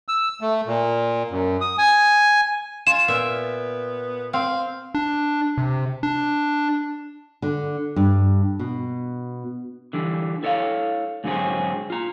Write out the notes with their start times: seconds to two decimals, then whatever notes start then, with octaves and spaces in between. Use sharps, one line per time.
0.08 E6
0.41 A3
0.67 A#2
1.30 F#2
1.61 D#6
1.78 G#5
2.87 F4 G#5 E7
3.08 A#2 B3 E5
4.33 C4 F5
4.95 D4
5.58 C3
6.03 D4
7.42 D3
7.96 G2
8.59 B2
9.93 D3 E3 G3
10.43 E4 A4 C#5 D5 F5
11.24 G#2 D3 F#3 C4 C#4 G#4
11.90 F4 A#5